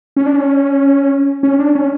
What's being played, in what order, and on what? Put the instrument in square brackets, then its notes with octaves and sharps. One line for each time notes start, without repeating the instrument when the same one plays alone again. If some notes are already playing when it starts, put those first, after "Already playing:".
[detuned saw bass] C#4
D4
C#4
C#4
D4
C#4